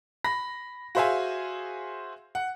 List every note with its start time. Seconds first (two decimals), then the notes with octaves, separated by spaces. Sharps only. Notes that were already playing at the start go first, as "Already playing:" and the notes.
0.24 B5 A#6
0.95 F#4 G#4 C5 E5 F5 G#5
2.35 F#5